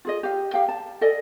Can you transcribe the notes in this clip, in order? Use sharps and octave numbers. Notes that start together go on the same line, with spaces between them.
F4 G#4 D#5
G4 F5
G4 F5 G5
A5
A4 D5 D#5 G#5